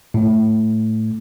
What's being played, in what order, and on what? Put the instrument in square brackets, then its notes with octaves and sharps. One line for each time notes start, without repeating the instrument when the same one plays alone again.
[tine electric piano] A2